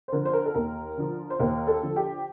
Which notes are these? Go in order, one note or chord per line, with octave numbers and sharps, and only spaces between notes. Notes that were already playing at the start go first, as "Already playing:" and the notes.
C5
D3 F3 A#4
C5
A#4
A4
D#2 A#4
D3 F3
C5
D#2 A#4
A4
D3 F3
G4